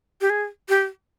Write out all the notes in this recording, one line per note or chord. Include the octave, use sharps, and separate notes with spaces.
G4
G#4
G4